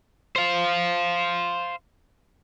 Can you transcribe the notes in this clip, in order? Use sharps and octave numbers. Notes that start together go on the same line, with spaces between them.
C5 F5